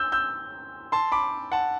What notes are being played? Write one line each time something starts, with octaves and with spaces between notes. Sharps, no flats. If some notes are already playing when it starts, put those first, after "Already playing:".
Already playing: E6 G6
E6 G6
A5 C6
B5 D6
F#5 A5